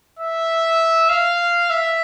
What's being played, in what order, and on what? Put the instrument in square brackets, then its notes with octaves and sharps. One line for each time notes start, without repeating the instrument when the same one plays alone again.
[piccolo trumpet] E5
F5
E5